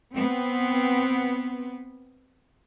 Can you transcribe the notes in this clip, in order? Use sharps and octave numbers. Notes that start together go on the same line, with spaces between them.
B3 C4